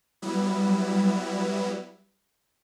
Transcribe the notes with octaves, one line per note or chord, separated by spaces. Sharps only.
F#3 G3 B3 E4